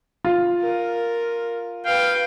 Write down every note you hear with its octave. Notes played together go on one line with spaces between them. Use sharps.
F4
A#4
B4 F5 G5